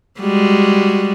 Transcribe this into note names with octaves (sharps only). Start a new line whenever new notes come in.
G3 G#3 F#4